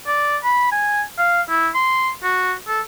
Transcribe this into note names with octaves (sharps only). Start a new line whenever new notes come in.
D5
B5
G#5
F5
E4
C6
F#4
A4